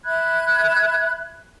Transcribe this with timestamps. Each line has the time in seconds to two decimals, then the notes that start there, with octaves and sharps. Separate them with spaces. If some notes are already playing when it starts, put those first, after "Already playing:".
0.04 E5 B5 F#6 G#6